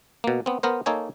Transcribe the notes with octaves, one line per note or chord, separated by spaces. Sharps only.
B2 A#3
B3 C4
B3 A#4 C5
A#3 D#4 A4 C#5 G#5